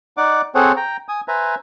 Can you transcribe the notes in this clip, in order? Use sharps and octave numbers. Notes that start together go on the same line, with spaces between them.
D#4 D5 F#5 D6
C4 G#4 A4 C5 C#5 F#5
G5 A#5
G#5 D#6
B4 C5 E5 G#5 A#5